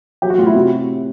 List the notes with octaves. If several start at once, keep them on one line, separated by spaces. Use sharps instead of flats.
F#3 G4
F#4
A2 F4
E4
C3 F#4